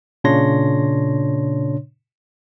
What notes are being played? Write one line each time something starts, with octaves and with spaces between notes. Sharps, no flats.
A#2 C#3 D4 C#5 C6 A#6